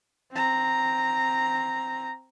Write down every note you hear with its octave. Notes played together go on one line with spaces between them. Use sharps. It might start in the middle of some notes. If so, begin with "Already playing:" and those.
C4 A#5